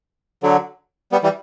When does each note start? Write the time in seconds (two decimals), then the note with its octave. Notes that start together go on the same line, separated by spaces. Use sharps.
0.43 D3 F#3
1.12 G3 B3
1.23 E3 G3